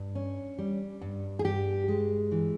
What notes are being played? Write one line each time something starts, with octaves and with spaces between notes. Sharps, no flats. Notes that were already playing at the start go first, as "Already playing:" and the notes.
Already playing: G2
C#4
G3
G2
G#4
G2 G4
G#3
E3